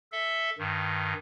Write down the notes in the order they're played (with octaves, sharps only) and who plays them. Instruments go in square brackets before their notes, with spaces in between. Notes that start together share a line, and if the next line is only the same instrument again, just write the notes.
[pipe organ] A4 E5
G2 D#3